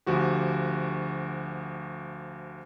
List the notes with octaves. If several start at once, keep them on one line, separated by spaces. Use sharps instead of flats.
D2 F3 F#4 G4